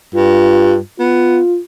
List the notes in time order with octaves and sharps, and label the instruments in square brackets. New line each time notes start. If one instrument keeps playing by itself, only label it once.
[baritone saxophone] G2 [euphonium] F4
[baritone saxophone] B3 [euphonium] F4